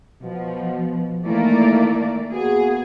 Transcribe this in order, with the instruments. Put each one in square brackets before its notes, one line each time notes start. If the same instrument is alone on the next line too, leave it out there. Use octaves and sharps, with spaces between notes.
[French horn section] B2 [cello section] F3
[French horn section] D#3 E3 E4 [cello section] A3 A#3 D5
[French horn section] A#3 B3 F#4 [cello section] G#4